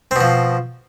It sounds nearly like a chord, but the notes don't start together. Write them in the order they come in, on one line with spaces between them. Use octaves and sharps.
C4 B2 F3